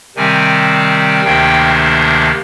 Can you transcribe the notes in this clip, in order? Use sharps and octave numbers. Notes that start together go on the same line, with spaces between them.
C3 D#3 G3 C4 G#5
D2 C3 D#3 A#3 D4 G5